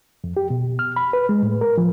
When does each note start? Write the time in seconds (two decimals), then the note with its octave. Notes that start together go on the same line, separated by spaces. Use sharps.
0.24 F2
0.37 G4
0.50 B2
0.79 F6
0.96 B5
1.13 B4
1.29 G#3
1.43 A2
1.61 A#4
1.78 F3